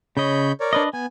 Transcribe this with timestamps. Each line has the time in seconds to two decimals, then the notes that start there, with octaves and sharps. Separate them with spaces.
0.17 C#3 C#5 D#5 B5 G6
0.60 A#4 C#5 D5
0.73 D4 B4 D#5
0.93 B3 G#5